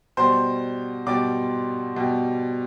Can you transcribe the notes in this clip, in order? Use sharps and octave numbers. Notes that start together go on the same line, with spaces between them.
B2 G3 C5 C6
B2 G3 D5 D6
B2 G3